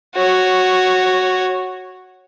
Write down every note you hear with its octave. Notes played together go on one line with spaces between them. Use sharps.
F#4 C#5